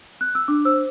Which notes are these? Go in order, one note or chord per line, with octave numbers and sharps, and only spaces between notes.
F#6
E6
D4 D6
C5 E6